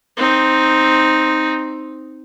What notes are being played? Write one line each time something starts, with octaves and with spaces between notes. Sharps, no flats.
C4 D#4